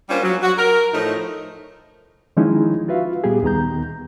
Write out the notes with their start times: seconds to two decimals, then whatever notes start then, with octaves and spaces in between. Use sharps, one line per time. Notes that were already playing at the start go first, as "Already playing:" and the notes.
0.09 G3 A#3 C#4 D4 F4 C5
0.23 F#3
0.43 F#4
0.57 A#4
0.93 A2 F3 A3 D#4
2.37 D#3 F3 G#3 C#4 D#4 E4
2.88 F4 F#4 B4 E5 F5
3.24 A#2 G3 B3 G4 G#4
3.43 D#2 D#3 B3 A#5 G6